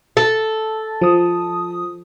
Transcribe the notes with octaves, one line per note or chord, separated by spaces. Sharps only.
A4
F3 D#6